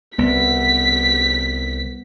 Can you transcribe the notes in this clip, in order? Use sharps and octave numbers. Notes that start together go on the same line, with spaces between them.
C2 B3 B6